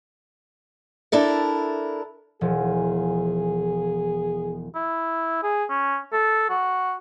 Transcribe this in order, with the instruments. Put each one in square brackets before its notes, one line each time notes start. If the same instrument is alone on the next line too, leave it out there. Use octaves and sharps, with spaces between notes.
[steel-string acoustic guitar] D4 E4 A4 A#4
[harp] E1 F3 [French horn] G#4
[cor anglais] E4
G#4
C#4
A4
F#4